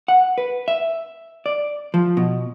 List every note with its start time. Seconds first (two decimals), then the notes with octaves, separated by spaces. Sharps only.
0.08 F#5
0.38 B4
0.68 E5
1.46 D5
1.94 F3
2.17 B2